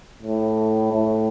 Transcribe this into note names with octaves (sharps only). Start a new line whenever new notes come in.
A2
A2